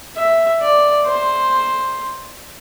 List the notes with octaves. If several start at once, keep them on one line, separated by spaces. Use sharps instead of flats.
E5
D5
C5